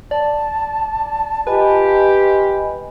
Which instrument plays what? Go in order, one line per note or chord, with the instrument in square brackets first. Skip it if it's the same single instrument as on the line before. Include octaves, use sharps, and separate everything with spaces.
[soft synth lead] D5 [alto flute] A5
[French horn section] F4 G4 [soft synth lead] B4 [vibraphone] D#5 G#5 B5